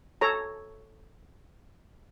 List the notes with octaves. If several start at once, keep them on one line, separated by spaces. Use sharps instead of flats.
A4 C#5 A#5